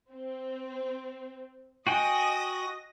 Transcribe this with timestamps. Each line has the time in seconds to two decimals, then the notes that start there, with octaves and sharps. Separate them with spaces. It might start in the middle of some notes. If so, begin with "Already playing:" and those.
0.11 C4
1.87 F#4 D#5 G5 G#5 D#6 A#6